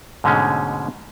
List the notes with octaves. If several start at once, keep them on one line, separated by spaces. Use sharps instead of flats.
G#2 B2 D3 G#3 A3 C#4